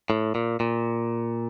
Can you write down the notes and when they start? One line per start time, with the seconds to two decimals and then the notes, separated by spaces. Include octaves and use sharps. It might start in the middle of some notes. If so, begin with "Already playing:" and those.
0.10 A2
0.35 A#2
0.60 A#2